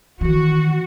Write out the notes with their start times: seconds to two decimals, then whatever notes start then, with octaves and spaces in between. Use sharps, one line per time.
0.21 D#3 E3 F#4